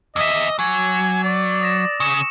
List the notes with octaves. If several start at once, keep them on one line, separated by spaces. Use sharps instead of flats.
E2 D#5 E5 D6 E6
F#3 G#5
D5
D#6 A#6 E7
C#3 C#6 C#7 E7